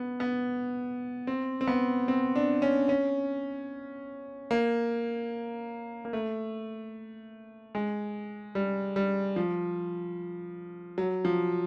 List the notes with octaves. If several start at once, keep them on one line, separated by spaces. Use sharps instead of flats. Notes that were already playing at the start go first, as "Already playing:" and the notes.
Already playing: B3
B3
C4
C4
B3
C4
D4
C#4
C#4
A#3
A#3
A3
G#3
G3
G3
F3
F#3
F3